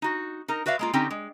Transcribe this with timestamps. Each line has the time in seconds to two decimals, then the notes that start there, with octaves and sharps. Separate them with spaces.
0.02 D#4 F#4
0.48 D#4 A#4
0.66 F#4 B4 D5 E5 F5
0.79 G#3 A#3 F4
0.93 D3 C4 C#4 D#4 G4 G5
1.10 G#3